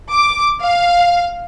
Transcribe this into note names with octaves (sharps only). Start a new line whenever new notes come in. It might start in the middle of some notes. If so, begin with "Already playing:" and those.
D6
F5